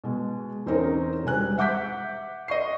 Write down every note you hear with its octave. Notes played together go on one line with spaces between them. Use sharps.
B2 G#3
E2 C4 C#4 D#4 A#4
E1 G3 G#5 F#6
E5 F#5 D6 G6 B6
D#5 C#6 C7